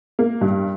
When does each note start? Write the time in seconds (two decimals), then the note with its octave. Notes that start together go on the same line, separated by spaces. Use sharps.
0.19 A#3
0.41 G2